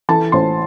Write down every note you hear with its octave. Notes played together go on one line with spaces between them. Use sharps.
E3 A4 A5
A1 C5 C6